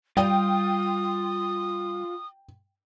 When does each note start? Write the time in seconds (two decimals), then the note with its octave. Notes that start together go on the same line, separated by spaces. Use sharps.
0.17 G3 F4 G5 D#6